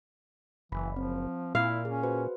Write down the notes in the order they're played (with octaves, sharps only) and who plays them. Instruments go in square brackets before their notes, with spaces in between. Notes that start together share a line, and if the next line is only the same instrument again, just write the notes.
[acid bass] F#1 [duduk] E3 [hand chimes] B5
[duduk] F3 [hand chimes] C4
[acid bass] A#2 [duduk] E4 [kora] F5
[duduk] C#4 [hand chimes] G#4
[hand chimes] F#4 B4 C5